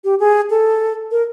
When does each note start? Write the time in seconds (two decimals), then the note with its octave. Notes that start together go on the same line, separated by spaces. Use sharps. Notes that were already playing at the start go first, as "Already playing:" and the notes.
0.04 G4
0.20 G#4
0.50 A4
1.11 A#4